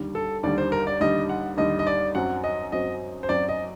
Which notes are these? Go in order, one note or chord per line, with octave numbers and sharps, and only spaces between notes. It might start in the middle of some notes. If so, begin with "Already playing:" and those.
Already playing: D#2 D3 G3
A4
D#2 D3 G3 D5
C5
A#4
D5
D#2 D3 G3 D#5
F#5
D#2 D3 G3 D#5
D#5
D5
F#2 F#3 C4 F#4 F#5
D#5
F#2 F#3 C4 F#4 D#5
C5
F#2 F#3 C4 F#4 D5
D#5